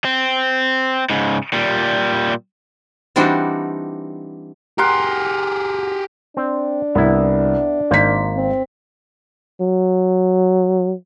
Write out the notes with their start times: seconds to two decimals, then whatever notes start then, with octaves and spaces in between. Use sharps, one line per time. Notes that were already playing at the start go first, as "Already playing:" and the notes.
0.05 C4
1.10 G#2 C#3
1.53 A#2 G3
3.16 E3 G3 C4 D4 D#4 F#4
4.78 G4 G#4 A#4 F#5 C6
6.37 C4 D4
6.95 C2 B3 E4
7.91 G#1 A#3 C5 B6
8.35 C4
9.61 F#3